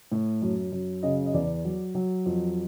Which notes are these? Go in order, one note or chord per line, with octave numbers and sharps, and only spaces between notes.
A2
F#2
F#2
C#3 D#5
D#5
E2 D5
F#3
F#3
F2